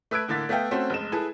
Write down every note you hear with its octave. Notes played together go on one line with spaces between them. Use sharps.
A3 B4 E6 F#6 G#6 D7
A2 D3 A#3 A6 B6
A3 B3 E5 F5 G5
A3 C4 C#4 F#4 C5
F1 G#3 E7
E4 G#4 A4 B4